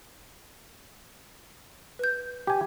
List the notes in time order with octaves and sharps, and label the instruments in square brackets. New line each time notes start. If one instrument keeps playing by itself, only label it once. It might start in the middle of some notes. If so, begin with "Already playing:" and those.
[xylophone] B4 G6
[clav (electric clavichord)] G4 G#5